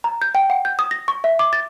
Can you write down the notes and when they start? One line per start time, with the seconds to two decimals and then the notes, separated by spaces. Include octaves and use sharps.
0.04 A#5
0.22 G6
0.35 G5
0.50 F#5
0.65 G6
0.79 D#6
0.91 A#6
1.08 C#6
1.24 E5
1.39 D6
1.53 A6